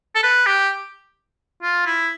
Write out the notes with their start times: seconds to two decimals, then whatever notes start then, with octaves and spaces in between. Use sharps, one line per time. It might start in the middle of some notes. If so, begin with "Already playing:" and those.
0.15 A4
0.24 B4
0.47 G4
1.63 F4
1.86 E4